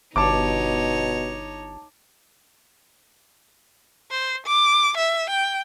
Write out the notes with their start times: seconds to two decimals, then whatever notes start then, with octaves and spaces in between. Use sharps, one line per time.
0.16 G1 B2 D#4 C#5 A5 D6
4.11 C5
4.46 D6
4.97 E5
5.30 G5